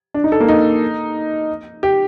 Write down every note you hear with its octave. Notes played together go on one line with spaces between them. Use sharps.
D4
D#4
A4
A#3
D#4
G4